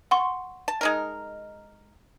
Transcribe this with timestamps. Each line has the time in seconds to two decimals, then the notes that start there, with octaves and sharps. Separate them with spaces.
0.11 F#5 C6 C#6
0.68 A5
0.81 G#3 D#4 A#4